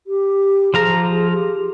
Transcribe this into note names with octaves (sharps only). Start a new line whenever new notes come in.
G4
F3 G#4 F5 A#5
G4